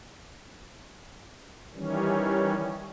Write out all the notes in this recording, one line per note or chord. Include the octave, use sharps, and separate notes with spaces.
D#3 E3 G3 C#4